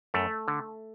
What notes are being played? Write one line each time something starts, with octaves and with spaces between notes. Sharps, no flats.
F#2 A3
D3